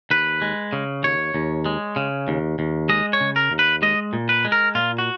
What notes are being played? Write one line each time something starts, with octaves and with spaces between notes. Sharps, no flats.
D#2 B4
G#3
C#3
D#2 C#5
D#2
G#3
C#3
D#2
D#2
G#3 D#5
C#5
C#3
A#4
D#2
B4
G#3 D#5
A#2
B4
G#3
A#4
A#2 F4
F#4